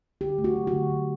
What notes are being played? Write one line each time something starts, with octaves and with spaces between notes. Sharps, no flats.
D3 G4
A3
F#4
F#3
D3 F#4
D3